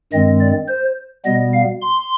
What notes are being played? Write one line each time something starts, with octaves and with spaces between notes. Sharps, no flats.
G2 D#3 G#3 C4 D#5
D5
C5
B2 G3 B3 D#5
F5
C6